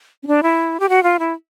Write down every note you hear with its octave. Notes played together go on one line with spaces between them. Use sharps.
C#4
D4
E4
G4
F#4
F4
E4